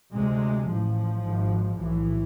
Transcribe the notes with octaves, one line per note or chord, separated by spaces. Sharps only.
D2 C3 G#3
A1 A2 F3
G#1 G#2
B1 A2 E3